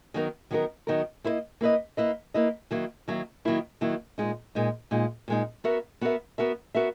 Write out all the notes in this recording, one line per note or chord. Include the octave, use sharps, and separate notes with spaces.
D#3 F#3 B3 D#4 A#4
D#3 F#3 B3 D#4 A#4
D#3 F#3 B3 D#4 A#4
A#3 E4 B4 D#5
A#3 E4 B4 D#5
A#3 E4 B4 D#5
A#3 E4 B4 D#5
D#3 F#3 A#3 E4
D#3 F#3 A#3 E4
D#3 F#3 A#3 E4
D#3 F#3 A#3 E4
A#2 G#3 D#4
A#2 G#3 D#4
A#2 G#3 D#4
A#2 G#3 D#4
B3 F#4 A#4 E5
B3 F#4 A#4 E5
B3 F#4 A#4 E5
B3 F#4 A#4 E5